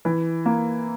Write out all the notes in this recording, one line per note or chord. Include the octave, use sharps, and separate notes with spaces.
E3
A#3